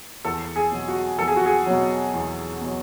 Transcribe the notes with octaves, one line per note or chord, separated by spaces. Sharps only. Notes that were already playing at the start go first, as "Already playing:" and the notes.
E2 A4
G#4
B2 F#3
F#4
E2 A4
G#4
F#4
G#4
B2 F#3
E2
B2 F#3